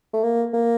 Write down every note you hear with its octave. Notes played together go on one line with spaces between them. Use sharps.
A3
A#3
A#3